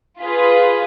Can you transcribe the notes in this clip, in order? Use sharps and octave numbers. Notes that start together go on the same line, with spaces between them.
F4 G#4 B4